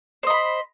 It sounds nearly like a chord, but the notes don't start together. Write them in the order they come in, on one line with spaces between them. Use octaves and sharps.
C5 D#5 B5